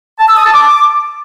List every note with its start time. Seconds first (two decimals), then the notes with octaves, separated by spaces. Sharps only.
0.19 A5
0.28 E6
0.37 D#6
0.45 A5
0.54 D6